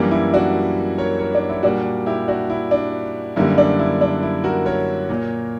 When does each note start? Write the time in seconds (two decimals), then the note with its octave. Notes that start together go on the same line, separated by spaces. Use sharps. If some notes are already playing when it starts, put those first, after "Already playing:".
Already playing: F#2 E3 G3 A#3 D4
0.11 E4
0.34 D4 F#4
0.98 A#4 C#5
1.19 A#4 C#5
1.35 D4
1.49 E4
1.63 A#2 G3 A#3 D4 F#4
2.06 E4 G4
2.28 D4 F#4
2.50 E4
2.71 D4
3.36 F#2 D3 G3 A#3 E4
3.58 D4
3.79 E4
4.01 D4
4.23 E4
4.44 F#4 A#4
4.66 A#4 C#5
5.09 A#2 A#3